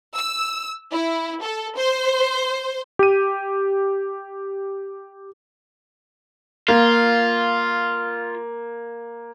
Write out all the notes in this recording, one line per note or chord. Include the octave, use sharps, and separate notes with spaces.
E6
E4
A4
C5
G4 D#7
A#3 F4